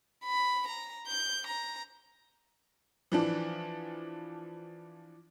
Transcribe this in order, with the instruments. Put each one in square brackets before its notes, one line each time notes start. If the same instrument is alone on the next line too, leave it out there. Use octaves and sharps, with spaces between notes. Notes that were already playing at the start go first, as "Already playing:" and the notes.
[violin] B5
A#5
G6
A#5
[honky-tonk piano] E3 F3 D4